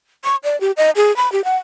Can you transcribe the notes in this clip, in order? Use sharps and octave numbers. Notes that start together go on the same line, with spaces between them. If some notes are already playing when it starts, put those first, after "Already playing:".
C#6
D5
G4
D#5
G#4
B5
G4
F#5